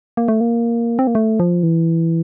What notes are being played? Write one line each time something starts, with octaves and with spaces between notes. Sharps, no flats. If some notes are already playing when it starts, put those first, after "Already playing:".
A#3
A3
A#3
C4
A#3
A3
F3
E3